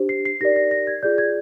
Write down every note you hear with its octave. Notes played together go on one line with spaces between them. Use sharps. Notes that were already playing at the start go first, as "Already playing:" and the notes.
Already playing: D4 G4 C5
C7
C7
D#4 G4 A#4 D5 A#6
A#6
A#6
G#6
F4 G#4 D5 G6
G#6